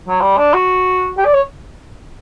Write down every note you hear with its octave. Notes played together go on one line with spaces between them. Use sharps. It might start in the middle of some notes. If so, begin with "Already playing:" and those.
F#3
G3
D4
F#4
G4
D5
C#5